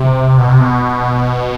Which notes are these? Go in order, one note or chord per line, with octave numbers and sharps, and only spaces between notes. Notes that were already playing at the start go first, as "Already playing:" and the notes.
Already playing: C3
B2
C3
B2